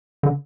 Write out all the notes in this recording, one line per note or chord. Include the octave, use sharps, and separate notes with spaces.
D3